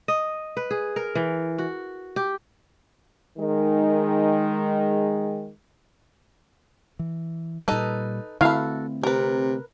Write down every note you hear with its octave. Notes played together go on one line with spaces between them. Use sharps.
D#5
B4
G#4
A#4
E3
F#4
G4
D#3 G#3
E3
A#2 G3 D#4 A4 B4
D3 A3 C4 E4 F#4 A4 F5
C3 A#4 B4